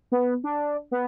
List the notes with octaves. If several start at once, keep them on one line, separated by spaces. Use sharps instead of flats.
B3
D4
B3